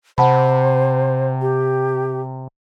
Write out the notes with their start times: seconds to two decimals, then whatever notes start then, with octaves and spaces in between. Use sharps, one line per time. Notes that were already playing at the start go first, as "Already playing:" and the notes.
0.18 C3 C5 F#5 A5 B5
1.41 G4